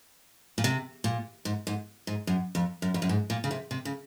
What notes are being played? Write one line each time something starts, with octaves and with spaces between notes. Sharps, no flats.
A#2
C3
A#2
G#2
G#2
G#2
F#2
F2
F#2
F2
F#2
G#2
A#2
C#3
C3
C3
C#3